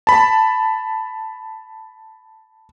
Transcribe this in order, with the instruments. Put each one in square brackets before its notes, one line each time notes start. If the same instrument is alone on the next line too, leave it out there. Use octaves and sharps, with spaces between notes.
[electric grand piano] A5 B5